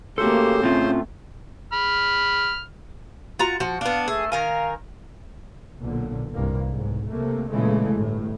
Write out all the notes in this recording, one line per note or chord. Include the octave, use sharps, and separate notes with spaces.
C#3 A3 A#3 F#4 G4 A4 C5 C6
A2 A3 C4 C#4 F4
B5 F6
F4 F#4 A#5
F3 F#4
B3 D4 F5
A3 G#4
D#3 A#4 F5 G#5
B1 A#2 D3
C2 G2 A#3
B1 G#2
C3 A3 A#3
A#2 C#3 E3 G#3 A3
G1 A2